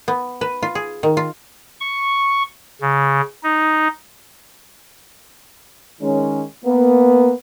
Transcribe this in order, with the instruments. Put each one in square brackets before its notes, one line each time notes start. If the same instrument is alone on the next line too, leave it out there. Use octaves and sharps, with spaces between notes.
[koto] B3
B4
F4
G#4
D#3
F4
[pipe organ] C#6
C#3
D#4
[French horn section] D#3 G#3 C#4
A#3 B3